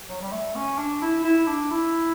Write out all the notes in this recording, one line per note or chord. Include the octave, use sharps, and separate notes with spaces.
F#3
G3
A3
C#4
D4
E4
E4
D4
E4